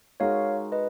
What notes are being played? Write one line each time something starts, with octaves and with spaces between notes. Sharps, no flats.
G#3 D#4 F#4 A#4 C#5 F5
B4 D#5